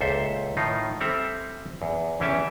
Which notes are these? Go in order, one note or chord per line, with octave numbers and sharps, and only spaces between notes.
C#2 A#2 A4 C5 E5
A2 D#3 D#4 F4
G3 C4 A4 E5 A#5
E2
E2 E3 C#4 G4 E5 A5